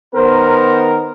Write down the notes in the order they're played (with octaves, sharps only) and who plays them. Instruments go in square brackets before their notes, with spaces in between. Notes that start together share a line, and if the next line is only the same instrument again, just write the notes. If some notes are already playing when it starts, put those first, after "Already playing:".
[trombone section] D#3 B3 A#4 [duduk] C5